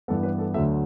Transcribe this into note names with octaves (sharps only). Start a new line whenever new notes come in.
G2 E3 B3 A4
B4
A4
D2 D3 F#3 A3 E5